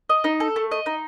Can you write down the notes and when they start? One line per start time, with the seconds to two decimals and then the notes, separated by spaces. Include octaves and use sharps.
0.09 D#5
0.24 D#4
0.40 A4
0.56 A3
0.71 D#5
0.86 D#4